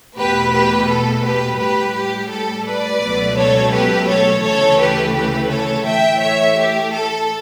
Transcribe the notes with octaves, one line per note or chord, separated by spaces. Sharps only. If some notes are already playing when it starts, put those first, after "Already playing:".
E2 B2 A3 G4 B4
G4 B4
A4
G4 B4
A2 G3 G4 B4
G4
A4
B4 D5
C#2 B2 F#3 A3
A4 C#5
G4 B4
A4 C#5
D2 C#3 E3 A3 A4 C#5
G4 B4
G4 B4
A4 C#5
A2 E3 A3 E5 G5
C#5 E5
G4
A4